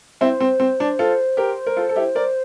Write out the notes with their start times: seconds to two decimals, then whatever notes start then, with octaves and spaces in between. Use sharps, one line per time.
0.21 C4 E4 C5
0.41 C4
0.60 C4
0.80 D4
0.99 F4 A4
1.37 G4 A#4
1.67 A#4
1.77 F4 A4
1.89 A4
1.96 E4 G4
2.15 A#4 D5